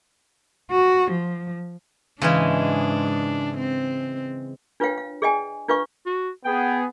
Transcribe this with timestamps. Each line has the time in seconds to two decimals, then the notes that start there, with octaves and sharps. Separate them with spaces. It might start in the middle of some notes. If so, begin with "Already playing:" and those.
0.71 F#4
1.11 F3
2.22 G#2 C#3 E3 G#3 D4
3.58 C4
4.80 D4 F4 B4 C#5 F5 G5
4.98 F5
5.22 G#4 D5 D#5 G5 G#5
5.68 D4 F4 B4 D#5 F5 C#6
6.06 F#4
6.45 B3 G#4 G5